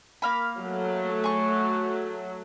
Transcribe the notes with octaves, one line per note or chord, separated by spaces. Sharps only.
A#3 F5 B5
F#3 A3
G#4 C#6